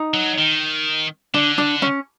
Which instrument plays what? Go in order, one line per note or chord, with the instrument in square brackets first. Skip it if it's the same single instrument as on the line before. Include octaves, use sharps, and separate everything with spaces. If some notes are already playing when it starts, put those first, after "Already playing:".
Already playing: [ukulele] D#4
[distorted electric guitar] F#3
D#3
[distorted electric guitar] D3 [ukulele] D4
[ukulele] D4
C#4